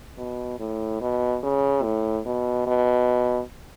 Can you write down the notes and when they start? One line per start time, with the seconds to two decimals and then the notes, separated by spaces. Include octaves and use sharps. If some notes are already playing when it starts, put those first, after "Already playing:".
0.18 B2
0.60 A2
1.01 B2
1.43 C#3
1.83 A2
2.26 B2
2.67 B2